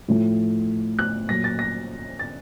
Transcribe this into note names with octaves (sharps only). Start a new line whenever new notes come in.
A2 F3
F#6
A#2 F#3 A#6
A6
A#6
A6